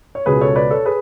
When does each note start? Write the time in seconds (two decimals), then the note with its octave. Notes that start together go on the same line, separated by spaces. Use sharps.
0.15 C#5
0.26 C#2 B2 G#4 B4
0.41 A4 C#5
0.56 B4 D5
0.71 A4 C#5
0.85 G#4 B4